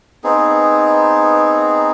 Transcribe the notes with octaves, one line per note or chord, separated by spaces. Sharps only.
B3 C4 D#4 G#4